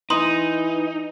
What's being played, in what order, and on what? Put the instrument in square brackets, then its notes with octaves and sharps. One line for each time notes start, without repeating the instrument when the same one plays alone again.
[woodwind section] E3 [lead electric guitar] D#4 [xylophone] A#5 C6 D#6